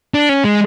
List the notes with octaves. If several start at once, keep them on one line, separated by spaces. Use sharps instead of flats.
D4
C#4
G#3